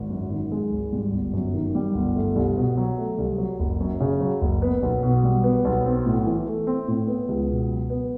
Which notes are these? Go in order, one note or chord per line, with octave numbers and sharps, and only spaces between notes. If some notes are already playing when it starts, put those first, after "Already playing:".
Already playing: G#1
F#2
D#3
G#3
G#1
G3
G1
F#2
D#3
G3
G1
A3
C2
B2
F#3
A3
C2
F#3
F#1
F#2
C#3
F#3
F#1
B3
B1
B2
G3
B3
B1
C4
A2
E3
A3
C4
A2
B3
C#2
B2
F#3
B3